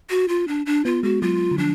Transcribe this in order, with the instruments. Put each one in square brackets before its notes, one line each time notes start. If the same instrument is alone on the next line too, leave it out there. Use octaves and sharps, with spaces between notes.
[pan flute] F#4
F4
D4
D4
[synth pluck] B3 [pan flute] F4
[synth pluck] G#3 [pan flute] F#4
[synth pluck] F#3 [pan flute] F4
[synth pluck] D3
[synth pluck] F3 [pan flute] D4